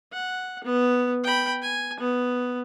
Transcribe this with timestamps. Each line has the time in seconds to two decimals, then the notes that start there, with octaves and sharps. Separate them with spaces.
0.13 F#5
0.64 B3
1.24 G5 B5
1.62 G#5
2.00 B3